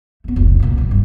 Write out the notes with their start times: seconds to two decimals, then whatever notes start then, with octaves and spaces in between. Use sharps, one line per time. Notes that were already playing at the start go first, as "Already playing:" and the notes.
0.24 A3 B3
0.36 F1 C#2
0.60 C2 A#2
0.78 D#3 E3
0.91 G1 G2